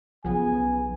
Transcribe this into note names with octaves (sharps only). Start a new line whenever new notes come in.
B1 C#3 F3 B3 G#4 G#5